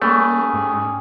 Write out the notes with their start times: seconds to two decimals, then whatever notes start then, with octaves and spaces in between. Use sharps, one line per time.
0.02 G3 A3 A#3 C#4 G#4
0.54 G#2